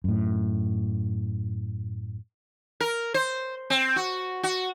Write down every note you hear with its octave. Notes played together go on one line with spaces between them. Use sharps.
F#2 A2
A#4
C5
C4
F#4
F#4